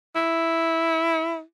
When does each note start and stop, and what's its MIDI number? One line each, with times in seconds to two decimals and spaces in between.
0.16 1.41 64